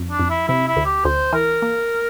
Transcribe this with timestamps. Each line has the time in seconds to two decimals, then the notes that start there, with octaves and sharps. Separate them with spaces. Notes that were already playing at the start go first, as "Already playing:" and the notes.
Already playing: F2
0.11 D4
0.20 F2
0.30 E4
0.48 C3 E4
0.67 E4
0.76 D2
0.86 G4
1.05 D2 C5
1.33 E3 A#4
1.62 A#3